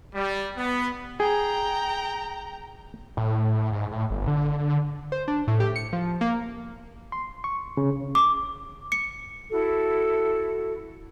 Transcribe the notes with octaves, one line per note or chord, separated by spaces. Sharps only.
G3
B3
G#4 G5 A#5
A2
G#2
A2
G1
D3
C5
D4
A2
G4
C#7
F3
A#3
C6
C#6
C#3
D6
C#7
E4 F#4 A4